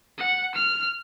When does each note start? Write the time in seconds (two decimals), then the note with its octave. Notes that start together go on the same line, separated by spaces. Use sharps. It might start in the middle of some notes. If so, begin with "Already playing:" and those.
0.18 F#5
0.55 F6